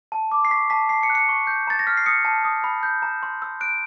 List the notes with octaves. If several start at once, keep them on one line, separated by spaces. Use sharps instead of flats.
A5
D6
C7
C#6 B6
A5 B6
A5 C7
C#7
F#6
C#7
C#6
G6
A#5 A6
A#6
F6 B6
C7
D#6 C#7
A5
D#6
B5
G6
A#5
C6
E6
F#6 D7